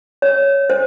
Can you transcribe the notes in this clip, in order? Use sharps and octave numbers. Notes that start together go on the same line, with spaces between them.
C#5
C5